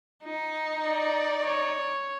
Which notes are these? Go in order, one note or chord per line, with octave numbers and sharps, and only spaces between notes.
D#4
D5
C#5